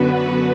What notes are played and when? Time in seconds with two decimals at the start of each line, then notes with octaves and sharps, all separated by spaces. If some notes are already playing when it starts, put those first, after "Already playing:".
Already playing: F#2 D3 B3 F#4 B4